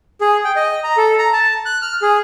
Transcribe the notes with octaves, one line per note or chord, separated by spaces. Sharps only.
G#4
G5
D#5
A#5
A4
A#5
A5
F#6
F6
G#4